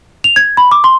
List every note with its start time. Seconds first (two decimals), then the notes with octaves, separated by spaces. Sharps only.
0.24 F7
0.36 G#6
0.57 B5
0.71 D6
0.84 C6